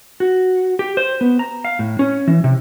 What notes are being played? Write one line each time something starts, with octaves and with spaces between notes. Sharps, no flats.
F#4
G4
C5
B3
A#5
F5
A2
C#4
E3
C3